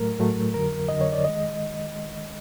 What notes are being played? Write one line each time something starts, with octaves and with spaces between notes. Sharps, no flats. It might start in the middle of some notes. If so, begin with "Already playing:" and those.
Already playing: A2 F#3 A3 A#4
A2 F#3 A3
F2 D3 F#3 A#4
F2 D3 F#3 D#5
C#5
D5
D#3 G#3 D#5